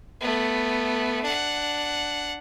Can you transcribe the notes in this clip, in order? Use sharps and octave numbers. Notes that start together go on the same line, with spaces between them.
A3 B3
D4 F#5